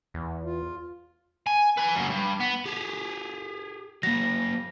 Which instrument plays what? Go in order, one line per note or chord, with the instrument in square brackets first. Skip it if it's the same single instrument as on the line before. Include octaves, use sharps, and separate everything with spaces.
[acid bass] E2
[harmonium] F4
[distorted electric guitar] G#5
B4 G#5
F#2 C#3
G2
B3
[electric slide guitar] G4 G#4
[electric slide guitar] F#3 A#3 [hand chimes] A#6